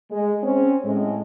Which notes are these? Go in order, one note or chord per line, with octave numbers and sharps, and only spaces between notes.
G#3
C4 C#4
A2 G#3